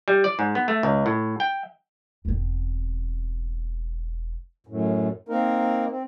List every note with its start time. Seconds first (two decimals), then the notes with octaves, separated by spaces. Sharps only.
0.08 G3
0.24 D5
0.39 G#2
0.55 B3
0.68 A3
0.83 C#2
1.06 A2
1.40 G5
2.25 E1 C4
4.67 F#2 A2
5.29 A#3 C4 D#4 A#4
5.89 C4